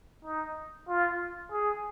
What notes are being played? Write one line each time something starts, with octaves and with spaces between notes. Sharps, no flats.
D#4
F4
G#4